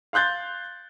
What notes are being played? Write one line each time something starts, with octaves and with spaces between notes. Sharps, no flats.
F5 C6 F#6 G6 A6